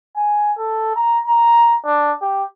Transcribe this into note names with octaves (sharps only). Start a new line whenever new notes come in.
G#5
A4
A#5
A#5
D4
G4